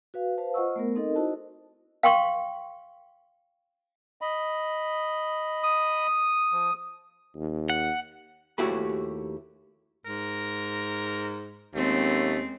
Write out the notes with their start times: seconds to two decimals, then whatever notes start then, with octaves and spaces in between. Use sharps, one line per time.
0.14 F#4 B4 F5
0.38 B4 C5 F5 A5
0.54 F4 C5 D#5 F#5 C#6 E6
0.76 A3 B3 A#4
0.96 C4 D#4 A4 A#4 D#5
1.16 D#4 E4 F#4 C5 D#5 A5
2.03 F5 G5 C6 C#6
4.21 D#5 B5
5.63 D#6
6.52 F3
7.36 D#2
7.70 F#5
8.58 D#2 A3 E4 F#4 G4 B5
10.06 G#2 A#4
11.74 D#2 G#3 A3 C4 C#4